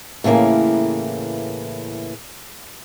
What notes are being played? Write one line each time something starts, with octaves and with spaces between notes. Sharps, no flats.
A2 C#3 E3 G3 A#3